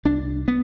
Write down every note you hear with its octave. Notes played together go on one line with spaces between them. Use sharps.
C2 D4
B3